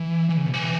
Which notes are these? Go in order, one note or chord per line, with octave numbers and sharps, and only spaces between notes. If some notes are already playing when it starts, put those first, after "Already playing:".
Already playing: E3
E3
C#3
B2
E3